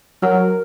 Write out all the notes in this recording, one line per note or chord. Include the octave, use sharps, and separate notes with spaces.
F#3 A#4